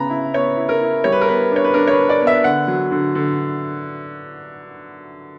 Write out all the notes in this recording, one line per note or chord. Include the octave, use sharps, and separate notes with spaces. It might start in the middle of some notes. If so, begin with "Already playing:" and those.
Already playing: C#3 B3 A#5 B5
E4
B3 C#5
E4
A#4
E4
G3 C#5
B4
A#4
B3 B4
D4 C#5
B4
D4 A#4
C#5
B4
D4
D5
B3
E5
D3 F#5
F#3
D3
D3